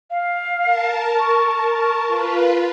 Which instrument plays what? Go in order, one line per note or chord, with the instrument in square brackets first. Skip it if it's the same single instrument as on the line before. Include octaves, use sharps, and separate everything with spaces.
[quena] F5
[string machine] A#4 A5
[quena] C#6
[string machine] F4 B4